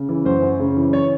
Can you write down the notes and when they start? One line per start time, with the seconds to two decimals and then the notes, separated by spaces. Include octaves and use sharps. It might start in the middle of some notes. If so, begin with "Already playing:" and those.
Already playing: C#3
0.09 E3
0.25 F#2 C5
0.42 F#2
0.59 C#3
0.77 E3
0.93 C#5